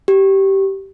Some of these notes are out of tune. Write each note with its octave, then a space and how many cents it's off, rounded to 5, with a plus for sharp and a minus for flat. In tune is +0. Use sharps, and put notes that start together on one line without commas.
G4 -15